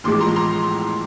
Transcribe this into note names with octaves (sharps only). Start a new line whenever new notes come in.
A1 A2 F3 G#3 C6 D6
A#5 C6
A#5 C6